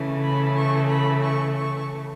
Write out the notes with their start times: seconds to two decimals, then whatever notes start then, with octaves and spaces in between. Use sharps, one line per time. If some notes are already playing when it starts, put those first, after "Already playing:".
Already playing: C#3 E3 A3
0.22 B5
0.56 C#6
0.89 B5
1.23 C#6
1.56 C#6